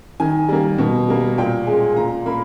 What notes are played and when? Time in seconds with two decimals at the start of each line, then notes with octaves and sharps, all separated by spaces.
0.20 D#3 G#5
0.49 G3 A#3
0.78 B2
1.08 G3 A#3
1.38 A#2 G5
1.67 G#3 G#5
1.96 A#2 A#5
2.26 A#3 B5